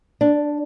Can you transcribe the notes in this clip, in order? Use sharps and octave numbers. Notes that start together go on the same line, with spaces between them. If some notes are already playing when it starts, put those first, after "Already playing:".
D4